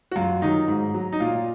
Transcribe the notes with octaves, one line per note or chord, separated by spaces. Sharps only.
F#4
F#2 F4
D#3 F#3 D#4
G#2
F#3
D#4
A#2 F4